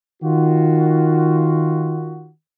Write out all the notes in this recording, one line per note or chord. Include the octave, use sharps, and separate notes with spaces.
D#3 F4 F#4